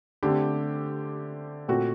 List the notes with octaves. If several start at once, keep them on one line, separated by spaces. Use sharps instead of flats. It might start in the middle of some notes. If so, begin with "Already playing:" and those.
D3 A3 C4 G4
A#2 A3 C4 F#4